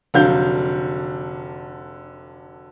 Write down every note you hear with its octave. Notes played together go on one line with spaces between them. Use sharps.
F1 D3 F#3 F5 G6